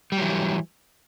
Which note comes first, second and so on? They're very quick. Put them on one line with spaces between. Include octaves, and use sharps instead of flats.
G3 F#3 E3